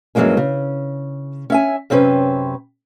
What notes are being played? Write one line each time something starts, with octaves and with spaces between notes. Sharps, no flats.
G2 E3 F#3 G#3 A#3 C#4
C#3
C#4 E5 G#5
F#2 C3 C4 C#4 B4